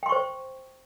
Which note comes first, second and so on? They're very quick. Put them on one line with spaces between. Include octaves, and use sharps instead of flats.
G5 C6 C#6 C5